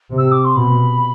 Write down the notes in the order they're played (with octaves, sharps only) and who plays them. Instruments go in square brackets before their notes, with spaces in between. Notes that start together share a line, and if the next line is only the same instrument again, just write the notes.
[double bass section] C3
[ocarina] E6
D6
C6
[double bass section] B2 [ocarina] B5